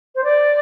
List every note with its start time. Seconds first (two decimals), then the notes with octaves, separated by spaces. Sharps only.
0.15 C5
0.24 D5